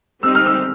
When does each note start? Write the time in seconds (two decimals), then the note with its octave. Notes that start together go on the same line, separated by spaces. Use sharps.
0.23 G3 C4 D#4 G4 E6
0.35 F6
0.46 E6